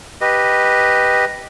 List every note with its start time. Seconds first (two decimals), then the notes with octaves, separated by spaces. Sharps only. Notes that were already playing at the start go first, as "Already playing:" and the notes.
0.21 G4 B4 D#5